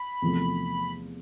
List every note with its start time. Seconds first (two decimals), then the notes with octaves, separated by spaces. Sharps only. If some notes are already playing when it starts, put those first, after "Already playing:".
Already playing: B5
0.22 E2 C3 F3 A3